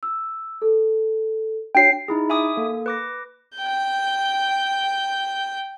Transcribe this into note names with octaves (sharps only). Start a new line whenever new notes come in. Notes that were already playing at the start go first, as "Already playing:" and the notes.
E6
A4
D4 F#4 C#5 G5 C7
D#4 E4 G#4
E5 G#5 D6 D#6
A#3 A4
B4 D6 A#6
G5 G6